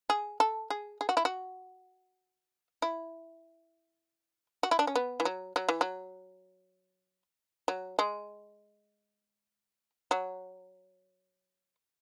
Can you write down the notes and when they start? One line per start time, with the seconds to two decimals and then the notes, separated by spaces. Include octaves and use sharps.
0.10 G#4
0.40 A4
0.70 G#4
1.01 G#4
1.09 F#4
1.17 E4
1.25 F#4
2.82 E4
4.63 F#4
4.71 E4
4.79 D4
4.87 C#4
4.95 B3
5.20 E3
5.25 F#3
5.56 F#3
5.69 E3
5.81 F#3
7.68 F#3
7.99 G#3
10.11 F#3